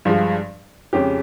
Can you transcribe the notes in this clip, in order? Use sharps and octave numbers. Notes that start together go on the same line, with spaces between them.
G2 F3 G#3
F2 C#3 G#3 C#4 G4